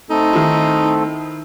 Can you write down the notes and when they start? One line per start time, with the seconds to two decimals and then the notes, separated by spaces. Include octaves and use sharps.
0.10 A3 C4 D#4 A4
0.33 D#3 E4